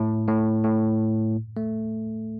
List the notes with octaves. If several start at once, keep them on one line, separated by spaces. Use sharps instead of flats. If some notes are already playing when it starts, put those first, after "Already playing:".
Already playing: A2
A2
A2
A3